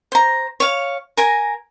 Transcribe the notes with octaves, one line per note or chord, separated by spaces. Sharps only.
C5 A#5
C#5 F5
A#4 G#5 A#5